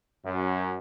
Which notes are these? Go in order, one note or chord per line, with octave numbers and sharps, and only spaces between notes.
F#2